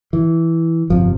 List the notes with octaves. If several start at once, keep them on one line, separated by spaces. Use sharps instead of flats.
E3
G1 F2 C3 F3